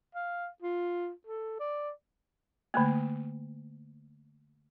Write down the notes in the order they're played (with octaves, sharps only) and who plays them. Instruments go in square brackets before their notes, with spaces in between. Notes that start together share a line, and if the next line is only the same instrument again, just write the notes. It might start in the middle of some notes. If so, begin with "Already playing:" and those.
[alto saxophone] F5
F4
A4
D5
[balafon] D3 A3 A#3